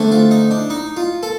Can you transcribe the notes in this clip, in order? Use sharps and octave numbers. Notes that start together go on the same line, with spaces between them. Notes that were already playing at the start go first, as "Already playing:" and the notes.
Already playing: D3 A3 C4
F4
D#4
D4
D#4
F4
A4